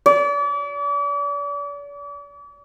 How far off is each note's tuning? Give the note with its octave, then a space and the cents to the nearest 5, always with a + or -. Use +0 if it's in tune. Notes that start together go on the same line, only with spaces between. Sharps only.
D5 -40